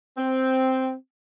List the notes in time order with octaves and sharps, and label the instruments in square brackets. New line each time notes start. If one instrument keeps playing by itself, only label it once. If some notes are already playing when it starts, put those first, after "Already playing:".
[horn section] C4